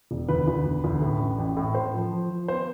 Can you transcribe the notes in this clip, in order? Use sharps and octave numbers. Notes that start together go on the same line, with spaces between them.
E1
D2 B4
D2
E1
D2
A2
A1
A1
A2
A2 C5
F3
F3
F3
B3 C5